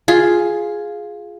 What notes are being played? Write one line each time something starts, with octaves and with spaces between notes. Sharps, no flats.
F4 G#4